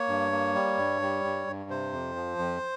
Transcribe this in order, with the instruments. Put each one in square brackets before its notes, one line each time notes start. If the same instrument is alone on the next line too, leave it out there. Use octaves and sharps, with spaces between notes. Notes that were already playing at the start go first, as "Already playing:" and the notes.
Already playing: [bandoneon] A#3 C#5
G2
A#3
G3
G2
G3
G2
G2
C3 C5
F2
F3
F2